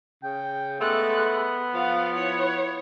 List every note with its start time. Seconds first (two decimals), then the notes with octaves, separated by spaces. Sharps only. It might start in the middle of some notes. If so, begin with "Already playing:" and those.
0.23 C#3 G5
0.81 G#3 A3 B3 F#6
1.74 F3 F5 F#5
2.15 E4 C#5